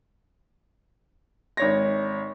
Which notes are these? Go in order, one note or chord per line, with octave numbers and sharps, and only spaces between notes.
G#1 C#5 A#6